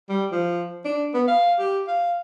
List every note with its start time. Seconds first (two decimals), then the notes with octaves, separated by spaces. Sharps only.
0.09 G3
0.32 F3
0.85 D4
1.14 B3
1.28 F5
1.59 G4
1.87 F5